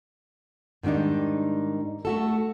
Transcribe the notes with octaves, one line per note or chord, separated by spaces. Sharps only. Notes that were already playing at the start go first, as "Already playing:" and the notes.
G#2 D#3 G3 D4 D#4
A3 F#4 A4